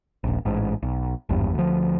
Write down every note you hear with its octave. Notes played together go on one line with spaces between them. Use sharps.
D#1 A#1
A1 G#2
B1
G#1 E2 G2
D2 F3